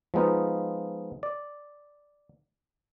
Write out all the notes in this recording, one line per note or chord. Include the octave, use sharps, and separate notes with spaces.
F3 G#3 B3 D#4 F4
D5